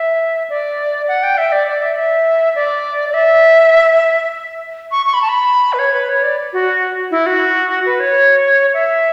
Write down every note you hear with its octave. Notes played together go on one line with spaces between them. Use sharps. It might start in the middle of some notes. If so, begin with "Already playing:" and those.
Already playing: E5
D5
F#5
G5
E5
D5
D5
E5
E5
D5
D5
E5
C#6
C#6
B5
A5
B5
B4
C#5
B4
C#5
D5
F#4
E4
F#4
B4
C#5
E5